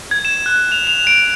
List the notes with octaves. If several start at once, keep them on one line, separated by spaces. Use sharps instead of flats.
G#6
E7
F#6
F7
F7
D7